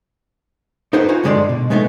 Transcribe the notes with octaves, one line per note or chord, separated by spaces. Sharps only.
D#4 E4 A4 B4 C5 F#5
D#4 F4 F#4 F#5 G#5
G2 D3 G#3 G4 D5 C6
B2
G#3 A3 B3 D4 D#4